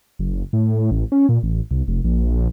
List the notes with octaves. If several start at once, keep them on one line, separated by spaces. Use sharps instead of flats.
F#1
A2
A1
C#4
A#2
A1
C2
F1
A#1